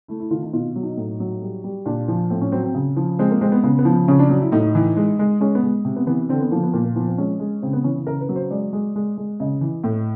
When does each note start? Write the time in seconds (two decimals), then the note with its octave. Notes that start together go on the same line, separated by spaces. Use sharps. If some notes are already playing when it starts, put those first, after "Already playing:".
0.08 A3 E4
0.20 E4
0.31 D#3 F4
0.43 D#4
0.53 B2 F4
0.76 F#3
0.83 D#4
0.97 A2
1.20 F#3
1.41 G3
1.64 G3
1.86 A#2 D4
2.08 F3
2.30 A2 C4
2.41 C#4
2.52 F#3 C4
2.64 C4
2.75 C#3
2.97 F3
3.19 G#3 C4
3.31 A#3
3.41 G#3 C4
3.52 B3
3.63 C#3 B3
3.79 B3
3.85 F3
4.08 C#3 C#4
4.19 D4
4.29 F#3 D4
4.42 E4
4.52 A2 D#4
4.75 E3
4.97 G#3
5.19 G#3
5.40 G#3 C#4
5.55 B3
5.64 G#3
5.85 C3
5.96 B3
6.07 E3 B3
6.29 D3 C4
6.41 B3
6.51 F3 A#3
6.63 B3
6.74 A#2 A#3
6.85 A#3
6.95 F3 B3
7.07 C4
7.18 G#3 C#4
7.40 G#3
7.62 C#3 C4
7.73 B3
7.84 E3 C#4
7.95 E4
8.07 C#3 A#4
8.21 B4
8.29 F#3
8.36 C5
8.51 G#3 D5
8.73 G#3
8.96 G#3
9.17 G#3
9.40 C#3 D#5
9.61 E3
9.84 A2